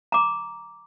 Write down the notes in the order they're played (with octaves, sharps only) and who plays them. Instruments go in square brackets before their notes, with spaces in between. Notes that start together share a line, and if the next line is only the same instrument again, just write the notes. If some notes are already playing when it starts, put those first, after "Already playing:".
[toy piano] A#5 D6